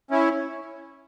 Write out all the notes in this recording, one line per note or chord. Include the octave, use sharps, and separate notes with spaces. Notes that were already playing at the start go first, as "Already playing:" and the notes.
C#4 E4